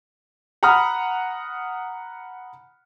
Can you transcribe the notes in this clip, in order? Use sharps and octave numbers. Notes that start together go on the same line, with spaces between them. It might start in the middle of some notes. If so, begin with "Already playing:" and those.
F#5 A#5 B5 D#6 F6